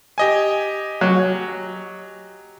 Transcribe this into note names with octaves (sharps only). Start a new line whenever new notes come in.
G4 D#5 G#5
F#3